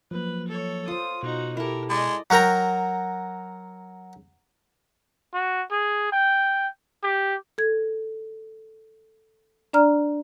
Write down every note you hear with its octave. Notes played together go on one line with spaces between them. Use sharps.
F3 F#3 A#3 B4
A4 C#5
F4 C5 D#6
B2 D#4 F#4
E4 G4 A4 A#4
G#3 D5 D#5
F#3 F#4 A#4 G5 A#5
F#4
G#4
G5
G4
A4 G#6
D4 D5 A#5 F6